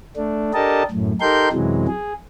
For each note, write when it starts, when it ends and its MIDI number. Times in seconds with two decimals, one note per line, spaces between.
0.17 0.52 57
0.17 0.52 62
0.54 0.83 62
0.54 0.83 67
0.54 0.83 69
0.54 0.83 70
0.54 0.83 75
0.54 0.83 81
0.91 1.12 42
0.91 1.12 45
1.21 1.49 63
1.21 1.49 67
1.21 1.49 69
1.21 1.49 70
1.21 1.49 84
1.21 1.49 91
1.52 1.87 42
1.52 1.87 48
1.52 1.87 52
1.52 1.87 54
1.52 1.87 56
1.87 2.13 68